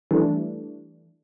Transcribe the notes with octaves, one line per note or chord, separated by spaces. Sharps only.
E3 G3 A3 D4